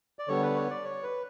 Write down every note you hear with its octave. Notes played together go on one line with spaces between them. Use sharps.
D5
D3 G3 B3 C#5
B4
C#5
D5
C#5
B4